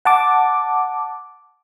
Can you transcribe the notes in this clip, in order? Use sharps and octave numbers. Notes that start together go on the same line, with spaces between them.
F#5 A5 D6